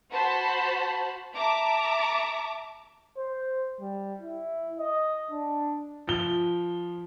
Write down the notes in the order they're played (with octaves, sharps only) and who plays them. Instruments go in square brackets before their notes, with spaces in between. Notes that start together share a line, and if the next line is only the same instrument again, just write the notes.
[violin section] F#4 C5 A5 B5
E5 A5 A#5 D6
[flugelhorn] C5
G3
E4
D#5
D4
[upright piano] F3 G7